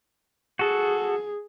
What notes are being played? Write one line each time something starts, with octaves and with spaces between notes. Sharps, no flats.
F#4 G#4 A4